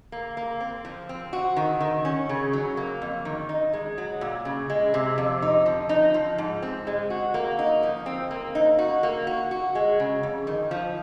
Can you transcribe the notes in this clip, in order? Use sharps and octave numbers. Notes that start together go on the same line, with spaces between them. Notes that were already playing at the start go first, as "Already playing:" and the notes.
A#3
A#3
C4
F3
C4
F#4
D#3
D#3
C#4
C#3
F#3
A#3
F2
D#3
D#4
G#3
F#3
A#2
C#3
G#3
C3
F2
D#4
F3
D#4
F3
G#2
C4
G#3
F#4
A#3
D#4
F3
C4
A#3
D#4
F#4
A#3
F#4
F#4
G#3
C#3
F2
D#3
F3